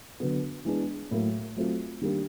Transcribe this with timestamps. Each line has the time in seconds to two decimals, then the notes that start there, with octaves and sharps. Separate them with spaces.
0.20 D3 F#3 B3
0.65 E3 G#3 B3 D4
1.11 A2 F#3 A#3
1.56 F#3 A3 C4 F4
2.01 D#3 G3 A#3 D4